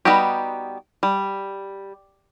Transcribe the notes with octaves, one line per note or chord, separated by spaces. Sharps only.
G3 B3 D#4 F#4 G4
G3